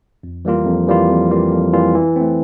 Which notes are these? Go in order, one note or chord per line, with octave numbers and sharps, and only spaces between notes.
F2
E3 G3 A#3 F4
F2
E3 G3 A#3 F4
F2
E3 G3 A#3 F4
F2
E3 G3 A#3 F4
E3
A3 C4